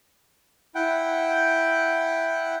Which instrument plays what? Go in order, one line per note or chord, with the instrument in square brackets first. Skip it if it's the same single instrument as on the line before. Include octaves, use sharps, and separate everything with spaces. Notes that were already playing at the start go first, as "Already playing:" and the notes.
[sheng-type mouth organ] E4 F#5 G5